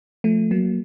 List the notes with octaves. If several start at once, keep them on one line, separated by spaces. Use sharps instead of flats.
F3 A3
F#3 A#3